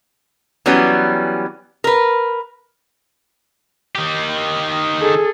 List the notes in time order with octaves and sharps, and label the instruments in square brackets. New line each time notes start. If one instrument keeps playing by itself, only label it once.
[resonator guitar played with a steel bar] E3 F#3 G3 B3 C#4
A#4 B4
[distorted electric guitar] D#3 G4
[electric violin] G#4 A4